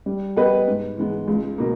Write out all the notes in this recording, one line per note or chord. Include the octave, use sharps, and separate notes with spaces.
G3
B3 G4 B4 D#5
G#2
E3 G#3 B3
C#2
B2 A#3